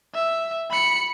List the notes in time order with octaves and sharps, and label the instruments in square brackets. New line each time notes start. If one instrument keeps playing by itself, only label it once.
[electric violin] E5
B5 C#7